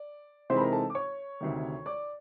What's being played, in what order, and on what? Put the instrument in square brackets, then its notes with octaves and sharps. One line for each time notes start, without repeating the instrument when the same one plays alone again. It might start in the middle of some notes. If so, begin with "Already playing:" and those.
Already playing: [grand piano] D5
C3 E3 G#3 C4 D#4 C5 C6
B5
A#4 A#5
A4 A5
D6
C#5 C#6
D2 C3 D#3
D5 D6